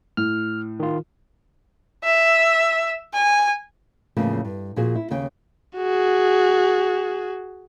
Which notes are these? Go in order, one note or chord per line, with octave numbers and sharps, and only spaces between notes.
A2 F6
D#3 F4
E5
G#5
E2 A2 C#3 F3 A3 A#3
G2
A#2 F3 F#4 G#4
E4
D#2 C#3 G5
F#4 G#4